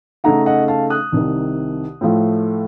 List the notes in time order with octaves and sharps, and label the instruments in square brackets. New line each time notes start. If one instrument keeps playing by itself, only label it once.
[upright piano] C#3 A3 D#4 F#5 A#5
D#5 F#5
F5 A5
D#6 F#6
C2 C3 D#3
A2 F3 A3